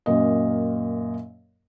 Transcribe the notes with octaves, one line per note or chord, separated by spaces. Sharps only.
F#2 A#2 D#5